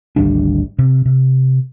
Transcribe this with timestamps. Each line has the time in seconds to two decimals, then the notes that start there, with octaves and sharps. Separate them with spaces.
0.16 G#1 D2 G3 D4
0.79 C3
1.05 C3